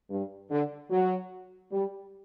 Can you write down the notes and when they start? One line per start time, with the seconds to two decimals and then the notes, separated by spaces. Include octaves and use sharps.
0.10 G2
0.50 D3
0.90 F#3
1.71 G3